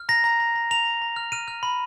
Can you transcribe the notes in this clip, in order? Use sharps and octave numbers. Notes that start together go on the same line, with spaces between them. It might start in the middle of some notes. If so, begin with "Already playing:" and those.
Already playing: F6
A#5 A#6
A#5
A#5
A#5
A#5 F7
A#5
A#5
F6
F6 D#7
F6
B5